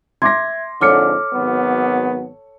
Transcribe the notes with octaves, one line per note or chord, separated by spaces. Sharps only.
E5 C6 D6 G#6 A#6
F2 G#2 D3 A4 C#5 D6 F6 C#7
G#1 F#3 B3